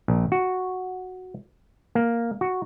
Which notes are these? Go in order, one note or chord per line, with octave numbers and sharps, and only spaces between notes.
A#1
F#4
A#3
F#4